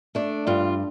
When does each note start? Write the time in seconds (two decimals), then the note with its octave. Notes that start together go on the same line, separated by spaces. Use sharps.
0.15 A3 D4
0.47 G2 F4